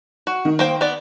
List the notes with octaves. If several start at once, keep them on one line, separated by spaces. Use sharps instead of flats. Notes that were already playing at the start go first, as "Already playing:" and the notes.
F#4
D#3
A#3 C5 G5
B3 D5